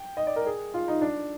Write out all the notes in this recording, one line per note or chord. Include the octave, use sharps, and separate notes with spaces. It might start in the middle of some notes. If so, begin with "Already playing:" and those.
Already playing: G5
D#5
D5
A#4
G#4
F4
D#4
D4